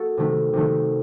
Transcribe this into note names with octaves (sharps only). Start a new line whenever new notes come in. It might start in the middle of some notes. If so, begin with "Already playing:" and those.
Already playing: A#3 F#4 A4
C3 D#3 A3
C3 D#3 A3